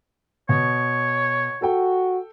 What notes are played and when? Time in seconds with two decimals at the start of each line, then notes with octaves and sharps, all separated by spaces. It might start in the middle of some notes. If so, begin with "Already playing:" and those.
0.49 B2 C#5
1.62 F#4 A4 G5